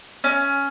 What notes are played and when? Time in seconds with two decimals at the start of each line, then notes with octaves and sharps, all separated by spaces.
0.24 C#4